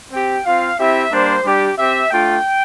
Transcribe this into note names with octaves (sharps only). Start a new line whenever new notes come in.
C4 G4 G5
C4 F4 F5
C4 E4 G4 E5
G3 A#3 D4 C5
G3 D4 G4
C4 G4 E5
A3 D4 F4 G5